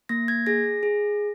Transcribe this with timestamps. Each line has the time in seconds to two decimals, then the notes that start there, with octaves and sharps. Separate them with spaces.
0.09 A#3 A#6
0.28 G#6
0.46 G#4 A#6
0.83 G#4